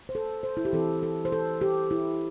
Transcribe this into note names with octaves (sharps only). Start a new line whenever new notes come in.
C5
A4
C5
E4
G4
E3 C4 A4
A4
C5
A4
G4
E4